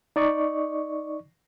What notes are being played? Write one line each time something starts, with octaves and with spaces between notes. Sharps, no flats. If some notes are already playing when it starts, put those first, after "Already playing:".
D#4 D5 D#5 C#6